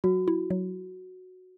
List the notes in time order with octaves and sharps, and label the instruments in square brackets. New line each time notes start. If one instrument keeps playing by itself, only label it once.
[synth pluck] F#3 [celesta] F#4
[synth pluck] E4
F#3